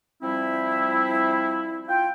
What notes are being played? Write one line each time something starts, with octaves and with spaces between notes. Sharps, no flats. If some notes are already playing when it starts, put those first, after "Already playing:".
F3 G3 C4 E4
F4 G5